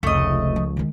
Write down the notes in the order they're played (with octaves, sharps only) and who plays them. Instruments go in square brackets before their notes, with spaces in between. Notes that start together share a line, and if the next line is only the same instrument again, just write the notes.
[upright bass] F1 [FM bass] C#2 [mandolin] A3 D#5
[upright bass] F3
D#3 G#3